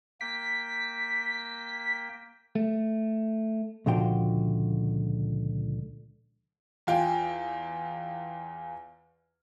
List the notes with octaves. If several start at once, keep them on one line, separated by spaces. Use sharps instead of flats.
A#3 G5 B6
A3
C#2 A#2 D3 F3 F#4 G5
E2 F4 G5 G#5